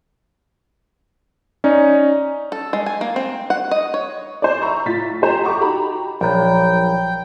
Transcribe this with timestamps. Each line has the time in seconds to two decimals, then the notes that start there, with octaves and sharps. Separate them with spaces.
1.64 C#4 D#4 D5
2.52 A4
2.73 G#3
2.86 G#5
3.01 A#3
3.16 C4
3.50 F#5
3.71 D#5
3.94 C#5
4.42 C5 D5
4.62 E5 A#5 B5 C#6
4.86 A2 F4 A6 B6
5.21 F4 G4 C5 A#5 C6 E7
5.42 D#5 F#5 A#5 C#6 D6
5.61 D#4 F#4 G4 A#5 B5
6.21 A#1 F3 F#3 C#5 G5 A#5 B5